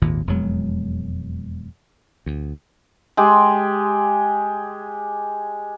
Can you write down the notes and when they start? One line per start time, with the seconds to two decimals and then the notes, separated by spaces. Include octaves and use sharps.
0.02 G#1 D#2 A#2
0.27 E1 F2 F#3 G#3
2.26 D2
3.17 G#3 G4